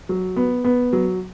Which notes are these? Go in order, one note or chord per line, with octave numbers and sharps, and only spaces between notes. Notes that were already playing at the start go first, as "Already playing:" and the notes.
F#3
B3
B3
F#3